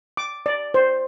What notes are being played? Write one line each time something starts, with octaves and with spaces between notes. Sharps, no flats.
D6
D5
C5